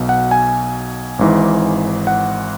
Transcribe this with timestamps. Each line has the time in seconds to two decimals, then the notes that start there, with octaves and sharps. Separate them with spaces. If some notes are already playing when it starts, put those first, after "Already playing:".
Already playing: B1 B2
0.09 F#5
0.31 G#5
1.19 G#1 G#2 E3
2.07 F#5